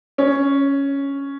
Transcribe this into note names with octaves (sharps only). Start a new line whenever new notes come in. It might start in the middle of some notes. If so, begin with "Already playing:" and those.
C#4